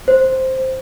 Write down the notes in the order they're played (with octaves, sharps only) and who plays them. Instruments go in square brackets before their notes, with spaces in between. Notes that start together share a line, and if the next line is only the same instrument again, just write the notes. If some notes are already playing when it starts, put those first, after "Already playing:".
[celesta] C5